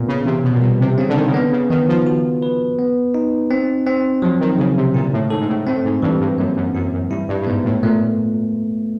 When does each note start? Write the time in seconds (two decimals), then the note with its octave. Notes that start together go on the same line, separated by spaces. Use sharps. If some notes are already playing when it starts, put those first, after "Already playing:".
Already playing: A#2 B3
0.08 C#3
0.25 C3 E3
0.44 B2
0.54 A#2
0.62 B2 G3
0.80 C3
0.98 C#3 C4
1.09 D3
1.16 D#3
1.27 C#3
1.34 D3 B3
1.52 C#3
1.70 D#3 B3
1.88 F3
2.07 F#4
2.42 B4
2.79 B3
3.14 D#4
3.51 C4
3.86 C4
4.22 F3 F#3
4.40 D#3
4.58 C#3 F#3
4.77 C3
4.94 A#2 E4
5.13 A2
5.30 G#2 A4
5.41 G#2
5.48 A2
5.67 A2 C4
5.85 G#2
6.02 G2 E3
6.21 G2
6.38 F#2 A#3
6.56 F#2
6.74 F#2 E4
6.93 F#2
7.10 G2 E4
7.29 G2
7.42 G2
7.47 G#2 B3
7.65 A2
7.83 A#2 A3